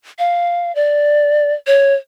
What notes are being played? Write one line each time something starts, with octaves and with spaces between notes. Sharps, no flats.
F5
D5
C#5